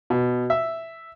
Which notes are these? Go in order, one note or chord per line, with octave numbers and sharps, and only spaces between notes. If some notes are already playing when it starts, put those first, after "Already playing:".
B2
E5